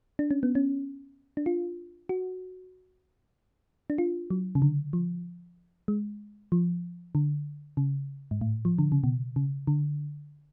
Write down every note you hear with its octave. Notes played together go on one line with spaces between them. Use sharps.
D4
C#4
B3
C#4
D4
F4
F#4
D4
F4
F#3
C#3
D3
F3
G#3
F3
D3
C#3
G#2
A2
F3
D3
C#3
B2
C#3
D3